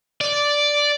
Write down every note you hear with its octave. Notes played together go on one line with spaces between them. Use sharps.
D5